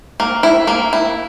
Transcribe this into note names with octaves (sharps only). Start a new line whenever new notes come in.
A#3
E4
A#3
E4